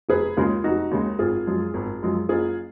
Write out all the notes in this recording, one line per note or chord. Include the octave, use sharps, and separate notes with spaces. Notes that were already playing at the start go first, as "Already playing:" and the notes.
F1 G#4 B4
D#2 C#3 G#3 F4 G#4
F1 D#4 F#4
D#2 C#3 G#3
G#1 F4 G#4
F#2 F3 G#3
G#1
F#2 F3 G#3
F#1 F4 G#4